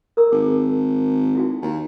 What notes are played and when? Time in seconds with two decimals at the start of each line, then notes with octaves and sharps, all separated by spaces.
0.17 A#4 A#5 E6
0.32 G#1 G#4
1.35 E4 F#4 G#5
1.62 D#2